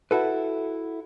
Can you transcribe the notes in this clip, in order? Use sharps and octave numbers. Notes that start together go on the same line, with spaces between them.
E4 F#4 A4 B4